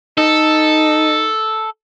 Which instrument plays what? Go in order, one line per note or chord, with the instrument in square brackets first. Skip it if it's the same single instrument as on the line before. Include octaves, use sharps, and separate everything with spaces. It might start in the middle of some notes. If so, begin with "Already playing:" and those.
[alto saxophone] D#4 [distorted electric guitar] A4